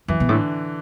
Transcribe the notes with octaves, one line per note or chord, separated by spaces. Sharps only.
F#2 E3
B2
A2 D3